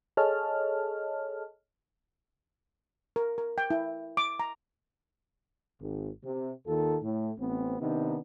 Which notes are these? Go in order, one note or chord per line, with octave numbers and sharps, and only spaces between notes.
G#4 A4 C#5 D#5 A5 F6
A#4
A#4
G5
E4
D6
A#5
G#1
C3
D#2 D#3 F4 A4
A2
A1 B3 C4
C3 D#3 B3 D4 D#4